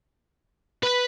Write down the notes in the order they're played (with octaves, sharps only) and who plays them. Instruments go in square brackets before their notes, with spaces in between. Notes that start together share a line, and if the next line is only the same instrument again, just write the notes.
[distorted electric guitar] B4